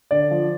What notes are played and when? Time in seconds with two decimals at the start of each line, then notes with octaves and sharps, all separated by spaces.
0.11 D3 D5
0.31 F3